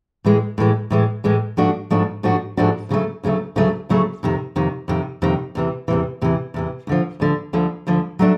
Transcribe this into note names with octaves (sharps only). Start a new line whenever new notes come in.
A2 E3 G#3
A2 E3 G#3
A2 E3 G#3
A2 E3 G#3
G#2 F3 A3 D4 F#4
G#2 F3 A3 D4 F#4
G#2 F3 A3 D4 F#4
G#2 F3 A3 D4 F#4
D2 C#3 F#3 A3
D2 C#3 F#3 A3
D2 C#3 F#3 A3
D2 C#3 F#3 A3
F2 C3 D#3
F2 C3 D#3
F2 C3 D#3
F2 C3 D#3
E2 C3 E3
E2 C3 E3
E2 C3 E3
E2 C3 E3
D2 D3 F3
D2 D3 F3
D2 D3 F3
D2 D3 F3
F#3 A3 D4